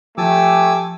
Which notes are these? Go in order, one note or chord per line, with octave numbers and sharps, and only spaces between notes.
F3 A3 G4 G#5 A5 D6 E6